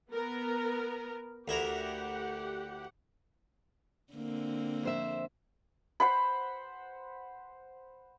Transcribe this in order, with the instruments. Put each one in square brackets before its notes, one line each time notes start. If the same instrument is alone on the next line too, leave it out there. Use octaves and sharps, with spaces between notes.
[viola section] B3 A#4
[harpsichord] D2 E4 A#4 [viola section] G4 F#5
[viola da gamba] D3 A#3 C4
[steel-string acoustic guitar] F2 C5 E5
[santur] C5 F#5 B5